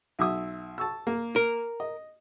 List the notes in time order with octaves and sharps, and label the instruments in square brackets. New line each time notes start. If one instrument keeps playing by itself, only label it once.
[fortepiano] B1 E5 D#6
A5 C#6 E6
A#3
[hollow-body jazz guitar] A#4
[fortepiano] D#5